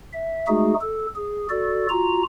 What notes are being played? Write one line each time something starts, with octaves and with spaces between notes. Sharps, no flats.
E5
G#3 A3 D#4 F#4 G#4
A4
G#4
F#4 A4 D5
F4 F#4 A#5